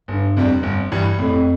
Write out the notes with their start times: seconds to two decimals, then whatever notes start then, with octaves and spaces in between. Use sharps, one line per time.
0.08 G1 G2
0.37 F2 C3 G3 D4
0.63 G1
0.92 G2 E3 G3
1.19 F2 A2